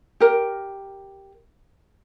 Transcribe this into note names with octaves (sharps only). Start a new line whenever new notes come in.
G4 A#4